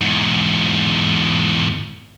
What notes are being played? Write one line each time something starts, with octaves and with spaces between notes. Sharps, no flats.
E2 G#2